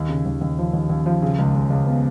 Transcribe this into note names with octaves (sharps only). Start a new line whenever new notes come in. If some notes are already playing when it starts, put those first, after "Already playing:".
Already playing: D#2
C#3
D#2
D#2
F3
D#2
D#2
F3
C#3
C#2
C#2
C#2
B3